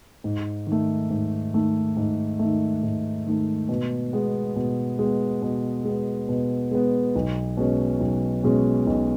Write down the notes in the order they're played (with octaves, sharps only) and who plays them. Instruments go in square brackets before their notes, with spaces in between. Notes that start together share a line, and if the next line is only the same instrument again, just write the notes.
[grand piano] G#2
D#3
A3
G#2
D#3 A3
G#2
A3
D#3
G#2
D#3 A3
B2
G#3 B3
B2
G#3 B3
B2
G#3 B3
B2
G#3 B3
B1
B2 G#3 C#4
B1
B2 G#3 C#4
B1